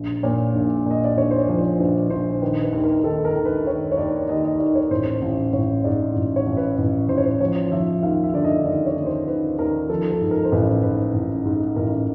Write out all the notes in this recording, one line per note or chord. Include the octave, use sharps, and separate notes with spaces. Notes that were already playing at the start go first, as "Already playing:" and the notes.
Already playing: A#1
A#2 C#5
A#1
A#2 D#5
D5
A#1 C#5
C5
C#5
F3
C5
A#1 B4
A#1 C5
D#3 B4
B4
D#2
A#4
A#4
D#3 A4
A#4
D#3
B4
D#3 C#5
C#5
D#2 D5
D#2 D#5
D#5
D#2 D5
C#5
A1 C5
A1
A1 C#5
G#2 D5
A1
C#5
A1
B4
A1
A1 C5
C#5
C5
F3 C#5
F3 E5
D#2 F5
E5
D3 D5
D#5
D#2 D5
C#5
D#2
C5
D#2 B4
D#2 A#4
F3 A4
A4
G#2
A#4
C5
A1 B4
G#2 B4
A1
G#2
A1 A#4